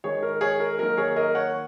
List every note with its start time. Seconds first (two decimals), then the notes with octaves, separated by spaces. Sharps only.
0.04 D#3 G#3 G#4 C#5
0.23 A#4
0.41 G#4 C#5
0.60 A#4
0.79 D#3 F#3 A#3 A#4
0.97 G#4 C#5
1.16 A#4 D#5
1.35 C#5 F#5